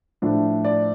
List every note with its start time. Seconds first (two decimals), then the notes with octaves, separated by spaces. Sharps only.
0.22 A2 F3 A3 D4
0.65 D5